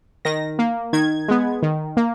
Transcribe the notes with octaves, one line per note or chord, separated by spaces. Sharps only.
D#3 A#6
A#3
D#3 G#6
G#3 B3
D#3
A#3